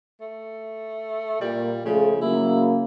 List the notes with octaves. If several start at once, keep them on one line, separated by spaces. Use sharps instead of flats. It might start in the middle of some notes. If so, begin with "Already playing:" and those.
A3
A#2 G3
C#3 F3 A3 G#4
C#3 F#3 A#3 E4